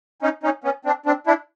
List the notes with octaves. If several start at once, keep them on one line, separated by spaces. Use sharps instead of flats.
C#4 D#4
C#4 D#4
B3 C#4
C4 D4
C4 D4
D4 E4